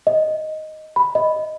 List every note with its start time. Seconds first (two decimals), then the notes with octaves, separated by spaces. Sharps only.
0.07 D#5
0.96 B5
1.15 D#5